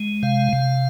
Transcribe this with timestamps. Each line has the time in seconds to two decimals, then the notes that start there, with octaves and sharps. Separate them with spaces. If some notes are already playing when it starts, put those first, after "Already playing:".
Already playing: G#3
0.23 C3 F5
0.53 C3